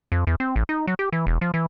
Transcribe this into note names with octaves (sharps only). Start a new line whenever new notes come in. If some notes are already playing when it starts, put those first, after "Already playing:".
F2
E2
C4
A1
D#4
F#3
G4
E3
E1
F3
E3